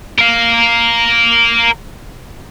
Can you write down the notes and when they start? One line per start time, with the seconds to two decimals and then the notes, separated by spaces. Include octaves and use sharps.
0.19 A#4 F5